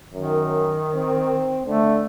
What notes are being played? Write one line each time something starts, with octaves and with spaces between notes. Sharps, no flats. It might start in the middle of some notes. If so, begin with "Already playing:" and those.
F#2 D#3
C4
D3 A3